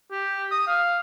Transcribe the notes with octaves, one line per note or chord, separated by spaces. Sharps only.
G4
D#6
F5